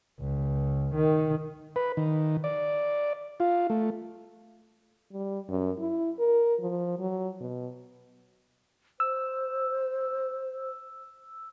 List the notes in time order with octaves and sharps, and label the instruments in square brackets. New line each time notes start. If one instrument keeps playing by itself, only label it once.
[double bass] C#2
D#3
[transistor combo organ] B4
D#3
D5
F4
A3
[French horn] G3
F#2
E4
A#4
F3
F#3
B2
[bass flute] C5 [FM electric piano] E6